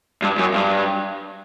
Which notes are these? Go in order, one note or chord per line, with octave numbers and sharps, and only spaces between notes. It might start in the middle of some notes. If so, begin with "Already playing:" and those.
G2
F#2
G2